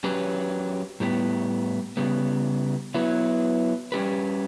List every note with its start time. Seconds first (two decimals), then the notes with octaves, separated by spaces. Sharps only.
0.04 F#3 C#4 G4 B4
1.00 A2 G3 B3
1.97 C#3 G3 B3
2.94 F#3 B3 E4 B4
3.92 G3 C#4 G4 B4